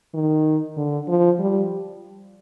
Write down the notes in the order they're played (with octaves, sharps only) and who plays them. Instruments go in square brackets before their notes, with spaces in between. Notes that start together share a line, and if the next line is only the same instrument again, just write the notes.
[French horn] D#3
D3
F3
G3